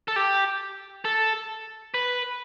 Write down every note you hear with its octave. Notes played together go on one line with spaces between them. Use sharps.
A4
G4
A4
B4